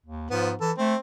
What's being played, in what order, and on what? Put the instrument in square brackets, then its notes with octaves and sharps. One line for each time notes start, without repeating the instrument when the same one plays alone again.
[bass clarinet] D#2
[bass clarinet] G#2 [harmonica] F3 B3
[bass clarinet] E3 [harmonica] A4
[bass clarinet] A3 [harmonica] C4